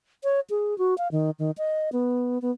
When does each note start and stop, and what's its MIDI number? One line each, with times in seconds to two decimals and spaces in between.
0.24 0.40 73
0.50 0.77 68
0.78 0.97 66
0.98 1.08 77
1.12 1.31 51
1.39 1.51 51
1.58 1.89 75
1.93 2.41 59
2.42 2.51 59